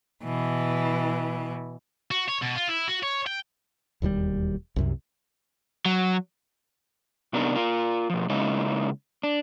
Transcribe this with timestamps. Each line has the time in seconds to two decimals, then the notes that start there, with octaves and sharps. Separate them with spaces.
0.25 B2 E3
2.11 F#4
2.29 C#5
2.42 B2
2.56 F4
2.69 E4
2.88 F#4
3.03 C#5
3.27 G5
4.02 E1 D#2 D#3 G3
4.76 C2 F#2 C3
5.86 F#3
7.33 C3 B3 D4 D#4 A#4
7.56 F4 A#4
8.10 B2 F3
8.29 C#3 G#3 A#3 D#4 E4
9.23 D4